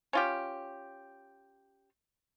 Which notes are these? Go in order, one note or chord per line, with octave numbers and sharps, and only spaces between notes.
C#4 F4 G4